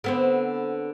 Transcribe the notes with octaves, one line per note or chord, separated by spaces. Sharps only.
D3 B3 C4